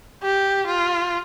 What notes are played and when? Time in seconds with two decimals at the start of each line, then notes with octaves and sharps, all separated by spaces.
0.23 G4
0.67 F4